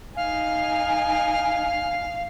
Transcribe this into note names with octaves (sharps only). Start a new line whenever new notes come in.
D#4 F5 G#5